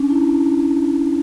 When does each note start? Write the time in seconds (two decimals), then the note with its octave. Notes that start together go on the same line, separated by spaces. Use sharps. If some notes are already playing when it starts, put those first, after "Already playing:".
Already playing: C#4 D4
0.09 E4